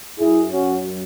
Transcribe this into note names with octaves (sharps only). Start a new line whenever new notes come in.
F#2 F#3 E4 G#4
C#4 F#4